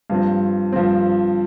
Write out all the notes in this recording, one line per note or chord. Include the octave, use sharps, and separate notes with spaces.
G2 F3 C4
G2 F3 C4